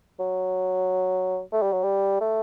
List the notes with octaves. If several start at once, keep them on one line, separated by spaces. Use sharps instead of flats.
F#3
A3
G3
F#3
G3
A3